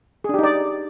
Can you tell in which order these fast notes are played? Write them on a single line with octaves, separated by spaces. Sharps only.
G#4 D4 G4 D#4 D5